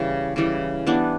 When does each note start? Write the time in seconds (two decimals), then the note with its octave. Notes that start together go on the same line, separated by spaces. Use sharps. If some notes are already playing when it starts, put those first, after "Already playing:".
Already playing: C#3 E3 G3
0.36 C#3 E3 G3
0.87 E3 G3 B3 D4